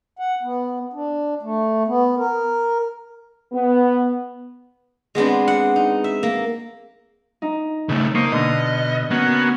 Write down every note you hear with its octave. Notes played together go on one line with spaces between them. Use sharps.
F#5
B3
D4
A3
B3
A#4
B3
G#3 B3 C4 D4
F#5
D#4
E5
A#3
D#4
C#3 A3 A4
A#3 C5 D#5 C#6
B2 D3 D#5 F6
A#3 B3 C#4 F#4